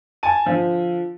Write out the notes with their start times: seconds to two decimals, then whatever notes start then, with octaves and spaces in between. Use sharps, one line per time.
0.23 G#5 A5 D#7
0.46 D3 F3